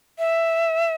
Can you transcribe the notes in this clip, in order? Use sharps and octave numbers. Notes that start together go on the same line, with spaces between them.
E5